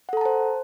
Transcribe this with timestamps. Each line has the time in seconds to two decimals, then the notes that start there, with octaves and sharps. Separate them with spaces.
0.09 F#5
0.13 A4
0.17 A#5
0.21 A5
0.25 C5